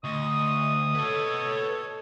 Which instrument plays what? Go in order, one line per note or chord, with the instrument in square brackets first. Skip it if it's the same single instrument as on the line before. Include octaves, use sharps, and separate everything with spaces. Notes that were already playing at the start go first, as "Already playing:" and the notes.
[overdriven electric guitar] D2 [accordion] D#5 C6 C#6 [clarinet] D#6
[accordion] A4 C#5 [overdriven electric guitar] B4 D#5